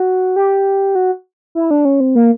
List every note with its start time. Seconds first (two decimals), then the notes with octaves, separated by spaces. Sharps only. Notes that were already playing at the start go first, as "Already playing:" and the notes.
Already playing: F#4
0.36 G4
0.95 F#4
1.55 E4
1.71 D4
1.85 C#4
2.00 C4
2.15 A#3